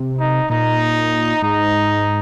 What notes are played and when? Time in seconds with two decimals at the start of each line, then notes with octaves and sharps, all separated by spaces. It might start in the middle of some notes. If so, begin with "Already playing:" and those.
Already playing: C3
0.19 D#4
0.50 A#2 D#4
1.42 G#2 D#4